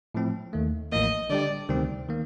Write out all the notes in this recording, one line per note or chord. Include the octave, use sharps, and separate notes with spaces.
A2 F3 C4
D#2 D#3 A3
A1 A2 F3 A#3 D#5
D3 G3 D4 G4 D5
D2 C3 D#3 G3 C4
D#3 A#3